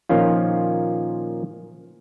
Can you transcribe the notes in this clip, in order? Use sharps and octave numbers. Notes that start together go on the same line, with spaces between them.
A#2 D#3 F3 A#3 C#4 F4